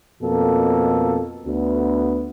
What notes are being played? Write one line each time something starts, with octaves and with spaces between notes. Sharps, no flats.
F2 B2 A#3 A4
D2 B3